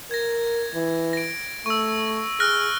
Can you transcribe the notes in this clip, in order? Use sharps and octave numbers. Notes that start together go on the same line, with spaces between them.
A#4 G#6 A#6
E3
A#6 D7
A3 C#6 E6
G#4 F6 F#6 A#6